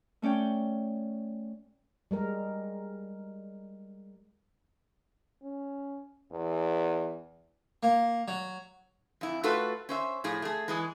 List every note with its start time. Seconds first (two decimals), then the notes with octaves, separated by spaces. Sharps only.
0.22 A3 C#4 D5 G5
2.11 G3 G#3 A#4
5.43 C#4
6.32 E2
7.83 A#3
8.28 F#3
9.21 F2 E4
9.44 A3 F4 F#4 A4 B4
9.89 C#4 C5 E5
10.24 A2 F3 G#4
10.42 A3 G#4
10.68 E3 G#3 G#4